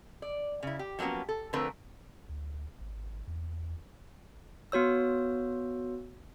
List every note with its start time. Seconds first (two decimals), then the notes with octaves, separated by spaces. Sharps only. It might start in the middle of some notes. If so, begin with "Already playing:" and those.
0.22 D5
0.63 C#3 E4
0.79 G4
0.99 F3 F#3 A#3 B3 C#4
1.29 A4
1.53 D3 F3 A3 C4 A#4 B4
2.29 D2
2.80 G#1
3.27 E2
4.72 B3 F#4 C#5 E6